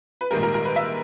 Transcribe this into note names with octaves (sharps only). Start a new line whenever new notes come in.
B4
A#1 G#2 D#3 G3 A#4
A#4
A#4
B4
E5